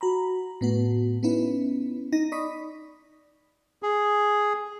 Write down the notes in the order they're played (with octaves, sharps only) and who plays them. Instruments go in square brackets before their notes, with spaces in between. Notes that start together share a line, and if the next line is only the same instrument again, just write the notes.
[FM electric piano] F#4 A#5 B5
A2 B3 F#4
B3 C#4 D#4 E4 B4
D#4 A#6
D5 D#5 B5 C#6 D#6 B6
[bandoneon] G#4